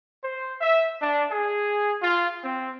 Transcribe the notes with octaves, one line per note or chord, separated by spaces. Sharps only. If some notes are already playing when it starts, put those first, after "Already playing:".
C5
E5
D4
G#4
F4
C4